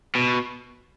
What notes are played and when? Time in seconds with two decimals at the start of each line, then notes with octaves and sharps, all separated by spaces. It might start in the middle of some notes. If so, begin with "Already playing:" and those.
0.15 B2